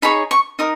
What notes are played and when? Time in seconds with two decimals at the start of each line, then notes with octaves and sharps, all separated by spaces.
0.02 D#4 G#4 C#5 B5
0.31 C#6
0.59 D#4 A#4 D#6